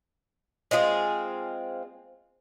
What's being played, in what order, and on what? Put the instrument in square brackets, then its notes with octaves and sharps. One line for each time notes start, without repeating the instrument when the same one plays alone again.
[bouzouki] G#3 C4 F4 G#4